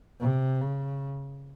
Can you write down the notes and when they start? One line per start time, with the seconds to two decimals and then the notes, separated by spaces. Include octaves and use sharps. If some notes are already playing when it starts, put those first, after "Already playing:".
0.21 C3
0.61 C#3